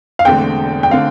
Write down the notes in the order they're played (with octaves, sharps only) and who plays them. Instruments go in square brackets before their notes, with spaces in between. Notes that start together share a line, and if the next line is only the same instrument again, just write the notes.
[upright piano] F5
[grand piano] E1 E2 D3 A3 C4 [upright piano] G5
[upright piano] G5
[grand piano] D3 A3 C4 [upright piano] F5